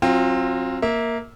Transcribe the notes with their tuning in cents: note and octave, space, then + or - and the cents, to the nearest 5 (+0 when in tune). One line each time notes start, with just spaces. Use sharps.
F#3 -15 C4 +25 F4 +0
A#3 +0 E5 -20